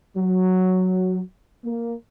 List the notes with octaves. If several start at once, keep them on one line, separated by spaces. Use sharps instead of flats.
F#3
A#3